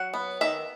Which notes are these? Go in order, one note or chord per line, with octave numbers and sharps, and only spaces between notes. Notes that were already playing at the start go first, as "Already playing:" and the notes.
Already playing: F#3 F#5
B3
D#3 E5